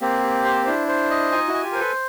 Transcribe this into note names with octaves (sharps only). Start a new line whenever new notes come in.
A#3 C4 G4
G4
C5
D4 E4 C5
C5
D#5
D#4 F4 G#5
E4 F#4
G#5
F4 G4
A#4
A4 B4 C5